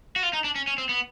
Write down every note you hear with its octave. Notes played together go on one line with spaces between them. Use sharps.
F#4
F4
D#4
D4
C#4
C#4
C4
B3